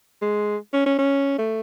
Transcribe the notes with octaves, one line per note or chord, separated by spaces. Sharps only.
G#3
C#4
C#4
C#4
A3